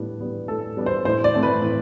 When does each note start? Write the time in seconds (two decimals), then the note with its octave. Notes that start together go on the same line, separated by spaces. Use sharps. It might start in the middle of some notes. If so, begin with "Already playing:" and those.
Already playing: A2 G3 B3 D4
0.20 G3 B3 D4
0.48 A2 A4
0.77 G3 B3 D4
0.86 C5
1.05 A2 C5
1.24 D5
1.33 E3 A3 C4
1.43 B4
1.62 A2